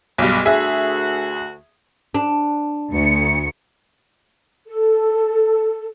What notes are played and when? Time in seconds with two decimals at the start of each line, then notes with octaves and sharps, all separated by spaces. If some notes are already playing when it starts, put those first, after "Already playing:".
0.18 B1 G2 G#3
0.46 D2 F#4 G#4 E5
2.15 D4
2.92 D2 C#7
4.67 A4